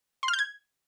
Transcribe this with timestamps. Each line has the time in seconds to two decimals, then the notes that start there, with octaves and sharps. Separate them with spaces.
0.23 C6
0.28 F6
0.33 G6
0.39 G#6